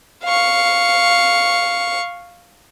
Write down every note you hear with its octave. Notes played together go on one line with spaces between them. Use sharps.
F5 C#6